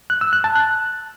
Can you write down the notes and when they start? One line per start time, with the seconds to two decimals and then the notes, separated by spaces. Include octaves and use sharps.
0.10 F#6
0.21 E6
0.33 F#6
0.44 A5
0.55 F#6